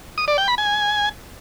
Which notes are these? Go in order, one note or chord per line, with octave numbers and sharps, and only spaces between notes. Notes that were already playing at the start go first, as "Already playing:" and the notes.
D#6
D5
G5
B5
G#5